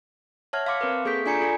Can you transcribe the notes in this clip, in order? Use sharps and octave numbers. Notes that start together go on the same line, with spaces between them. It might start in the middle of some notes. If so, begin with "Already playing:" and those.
C#5 E5 F#5 A5 F6 G#6
F5 A5 C6 D6 F6 C#7
C4 A#4 B4
A#3 G#4 A4 C#6 G6 B6
D4 F4 D5 G#5 A#5 C#7
F4 A4 D5 G#5